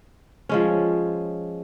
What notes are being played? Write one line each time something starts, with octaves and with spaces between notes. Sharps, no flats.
F3 G#3 C#4